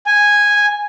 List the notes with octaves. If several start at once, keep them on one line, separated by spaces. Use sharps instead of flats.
G#5